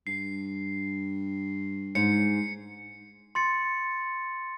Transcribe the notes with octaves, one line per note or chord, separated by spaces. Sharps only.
G2 C7
G#2 C#7
C6 A6 C#7